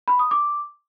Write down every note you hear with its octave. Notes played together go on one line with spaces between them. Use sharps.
B5
D#6
D6